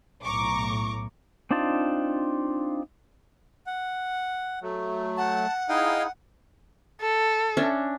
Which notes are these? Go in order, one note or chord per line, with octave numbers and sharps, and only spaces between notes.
B1 A2 A#5 C#6 D6
C4 D4 D#4 F4 A5
F#5
F#3 A3
F#5 A5
D#4 E4 G#4 D#5 F5 G5
A4
C#4 D4 E5